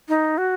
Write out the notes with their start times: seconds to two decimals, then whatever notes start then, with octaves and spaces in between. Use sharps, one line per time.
0.09 D#4
0.38 F#4